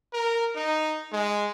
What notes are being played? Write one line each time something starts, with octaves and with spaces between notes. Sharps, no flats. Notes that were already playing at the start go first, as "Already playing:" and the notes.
A#4
D#4
G#3